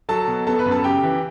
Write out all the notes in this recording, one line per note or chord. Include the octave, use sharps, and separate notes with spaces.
F#3 A4 A5
B2
B3 A4 A5
B4 B5
F#2
A4 A5
C#3 G4 G5
E3